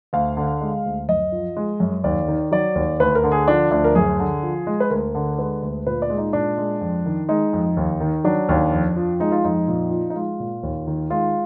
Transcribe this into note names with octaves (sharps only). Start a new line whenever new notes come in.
D2 F5
D3
G#3
D2
F#2 D#5
F3
G#3
F#2
D#2 D5
D#3
F#3 D5
D#2
D2 B4
A#4
D3
G#4
F3 D4
D2 D4
A#4
F#2 G#4
D3
F3
G#3
B4
D2 A#4
D3
G#3 B4
D2
A#2 B4
D5
G#3
D#4
A#2 D4
G#3
F2
D#3
G#3 D#4
F2
D#2
D#3
F#3 D4
D#2
F2
F3
G#3 D#4
F4
F2 D#4
A#2
F3
D#4
G#3 F4
A#2
D#2
D#3
G#3 F4